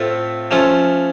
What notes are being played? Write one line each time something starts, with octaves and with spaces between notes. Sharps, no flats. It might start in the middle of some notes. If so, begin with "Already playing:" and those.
Already playing: A2 A3 C4 F4
F3 A3 C#4 F4